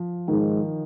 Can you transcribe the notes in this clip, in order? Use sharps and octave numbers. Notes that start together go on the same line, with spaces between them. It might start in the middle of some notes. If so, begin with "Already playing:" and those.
Already playing: F3
G#2 D#3